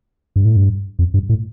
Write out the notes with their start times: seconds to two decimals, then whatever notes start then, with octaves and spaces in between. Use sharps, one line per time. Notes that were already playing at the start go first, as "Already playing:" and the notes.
0.36 G2
0.45 A2
0.56 G2
0.99 F2
1.14 G2
1.29 A2